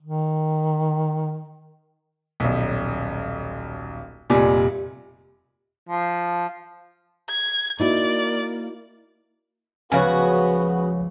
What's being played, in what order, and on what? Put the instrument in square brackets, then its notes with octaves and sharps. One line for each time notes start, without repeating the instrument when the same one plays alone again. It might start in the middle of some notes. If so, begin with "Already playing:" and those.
[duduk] D#3
[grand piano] D#1 B1
F1 A#2 G3 D5 G#5
[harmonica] F3
[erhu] G#6
[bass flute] A#3 [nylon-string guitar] D#4 E4 F#4 [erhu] D5
[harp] C#2 F3 [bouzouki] C#3 F#4 [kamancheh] B3 [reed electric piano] C#5 F5 G#5